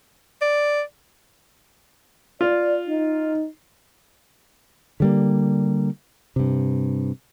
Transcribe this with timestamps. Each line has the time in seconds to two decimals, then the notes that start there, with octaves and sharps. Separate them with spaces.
0.41 D5
2.41 F4 D5
2.87 D#4
5.00 D3 G3 A#3
6.36 G2 C3